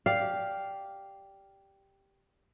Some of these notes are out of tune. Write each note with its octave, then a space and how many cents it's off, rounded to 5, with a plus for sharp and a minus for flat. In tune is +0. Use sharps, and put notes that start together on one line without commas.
G4 +0 D5 -10 F5 +0